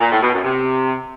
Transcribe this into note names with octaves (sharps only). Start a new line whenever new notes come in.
A#2
A2
B2
F#2
C3